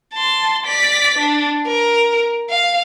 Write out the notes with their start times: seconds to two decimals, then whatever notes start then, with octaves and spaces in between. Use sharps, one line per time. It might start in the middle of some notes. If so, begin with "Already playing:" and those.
0.13 A5 C6
0.66 D5 B6
1.18 D4
1.67 A#4
2.50 F5